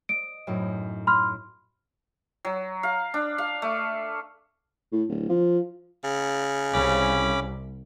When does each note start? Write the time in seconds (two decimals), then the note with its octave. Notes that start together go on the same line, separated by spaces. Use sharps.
0.09 D#5 D7
0.47 F#2 A2 D#4
1.07 B5 C6 F6
2.45 F#3
2.83 F5
3.14 D4
3.38 F5
3.62 A3
4.92 A2
5.09 D1
5.29 F3
6.04 C#3
6.73 C2 C#4 B5 D6